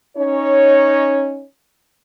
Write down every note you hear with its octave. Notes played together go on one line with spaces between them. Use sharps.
C#4 D#4 C#5